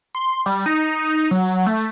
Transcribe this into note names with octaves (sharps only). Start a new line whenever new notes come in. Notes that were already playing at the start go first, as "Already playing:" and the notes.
C6
G3
D#4
F#3
A3